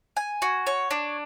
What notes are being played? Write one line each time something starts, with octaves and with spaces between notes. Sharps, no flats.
G#5
F#4
C#5
D4